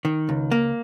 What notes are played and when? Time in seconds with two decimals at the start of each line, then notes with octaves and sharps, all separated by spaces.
0.05 D#3
0.29 C#2
0.52 A#3